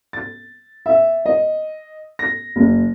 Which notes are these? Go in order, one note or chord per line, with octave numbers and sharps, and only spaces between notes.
A6
E5
D#5
A#6
F#1